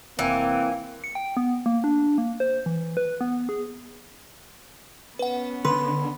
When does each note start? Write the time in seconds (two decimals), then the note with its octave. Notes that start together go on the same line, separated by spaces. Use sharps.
0.19 F1 E3 A#3 C4
1.04 C#7
1.15 G5
1.37 B3
1.66 A#3
1.84 D4
2.18 A#3
2.40 C5
2.66 E3
2.97 B4
3.21 B3
3.49 G#4
5.19 B3 C#4 B4 F#5
5.65 D3 B4 C6